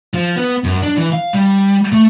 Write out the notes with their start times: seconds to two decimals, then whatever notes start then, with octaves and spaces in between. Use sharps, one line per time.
0.14 F3
0.36 B3
0.64 F#2
0.82 D4
0.97 E3
1.12 F5
1.33 G3
1.92 A3